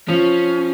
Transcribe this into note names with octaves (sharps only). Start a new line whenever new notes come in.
F3 C#4